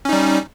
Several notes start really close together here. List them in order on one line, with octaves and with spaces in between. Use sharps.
C#4 D#4 G3